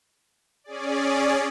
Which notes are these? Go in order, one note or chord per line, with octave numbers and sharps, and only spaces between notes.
C#4 G#4 D5